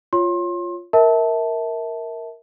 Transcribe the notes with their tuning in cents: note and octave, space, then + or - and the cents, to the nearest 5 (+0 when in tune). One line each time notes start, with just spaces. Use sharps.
F4 +0 C#5 +0 C6 +30
A#4 +0 E5 -30 A5 +0